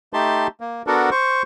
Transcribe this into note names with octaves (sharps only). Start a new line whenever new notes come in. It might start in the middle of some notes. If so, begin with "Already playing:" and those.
A3 D#4 G4 A5 C6
A#3
B3 D4 F#4 A4 A#4
C5 C#6